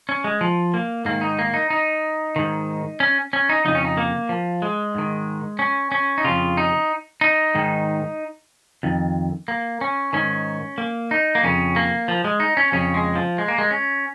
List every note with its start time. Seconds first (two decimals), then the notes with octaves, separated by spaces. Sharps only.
0.09 C#4
0.24 G#3
0.41 F3
0.74 A#3
1.05 G#2 D#3 A#3
1.21 D#4
1.39 A#3
1.54 D#4
1.70 D#4
2.36 G#2 D#3
3.00 C#4
3.33 C#4
3.49 D#4
3.65 F2 C#3 D#4
3.75 C#4
3.85 D#4
3.97 A#3
4.29 F3
4.62 G#3
4.95 G#2 D#3
5.59 C#4
5.92 C#4
6.18 D#4
6.24 F2 C#3 F4
6.57 D#4
7.21 D#4
7.55 G#2 D#3
8.83 F2 D#3
9.48 A#3
9.81 C#4
10.13 G#2 D#3 C#4
10.78 A#3
11.11 D#4
11.35 A#3
11.43 F2 C#3 C#4
11.76 A#3
12.08 F3
12.24 G#3
12.40 D#4
12.57 C#4
12.72 F2 C#3 C#4
12.94 G#3
13.16 F3
13.38 G#3
13.48 A#3
13.58 G#3
13.71 C#4